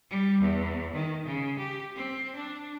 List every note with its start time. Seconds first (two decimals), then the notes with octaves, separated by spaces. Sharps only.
0.10 G3
0.41 E2
0.93 D#3
1.26 C#3
1.59 G4
1.96 C4
2.35 D4